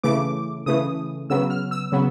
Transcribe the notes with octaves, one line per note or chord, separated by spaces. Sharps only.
C#3 E3 A3 D6
C#3 E3 A3 D#6
C#3 F#3 B3 E6
F6
E6
C#3 F#3 B3